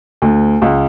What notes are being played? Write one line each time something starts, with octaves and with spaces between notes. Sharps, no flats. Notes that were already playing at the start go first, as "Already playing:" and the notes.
D2
C#2